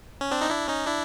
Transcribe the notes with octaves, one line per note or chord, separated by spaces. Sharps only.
C#4
C4 D4
D#4
D4 E4
C#4 D#4
D4 E4